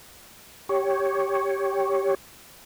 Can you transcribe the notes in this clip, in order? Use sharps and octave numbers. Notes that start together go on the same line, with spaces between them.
G4 C#5